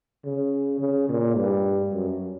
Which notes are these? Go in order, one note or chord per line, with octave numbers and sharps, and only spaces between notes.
C#3
C#3
A#2
G2
F#2